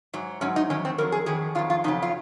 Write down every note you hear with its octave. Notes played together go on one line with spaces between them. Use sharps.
G#2 F#3
G#2 F#3 C#4
D#4
F2 D#3 F#3 C#4
C4
F2 D#3 F#3 A#4
G#4
F2 D#3 F#3 G#4
F2 D#3 F#3 F4
F4
F2 C#3 F#3 D#4
F4